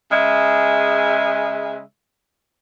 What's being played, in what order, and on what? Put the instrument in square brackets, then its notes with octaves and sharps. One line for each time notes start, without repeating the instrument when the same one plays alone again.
[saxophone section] C#3 G#3 E5